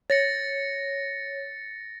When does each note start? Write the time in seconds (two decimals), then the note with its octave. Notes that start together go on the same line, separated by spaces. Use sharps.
0.10 C#5 A6 A#6 C#7